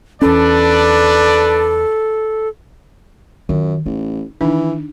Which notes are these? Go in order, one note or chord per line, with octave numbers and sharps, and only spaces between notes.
E2 C#4 D4 A4 B4 D5
F#2 D#3 F4
A1 D#4
D#3 E3 D4 D#4